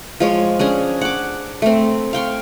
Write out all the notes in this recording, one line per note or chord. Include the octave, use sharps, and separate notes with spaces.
F3 G#3 C#5
C#4 D4 G#4
F#5 D6
A3 C4
F5 G5 C6 C#6